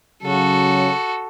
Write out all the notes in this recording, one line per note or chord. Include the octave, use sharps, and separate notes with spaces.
C#3 F#3 F#4 A4